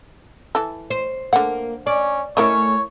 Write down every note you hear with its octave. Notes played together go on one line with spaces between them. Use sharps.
E3 A4
C5
D3 A#3 F#5
C#4 D5
A3 C#4 E4 A#4 C#5 D#5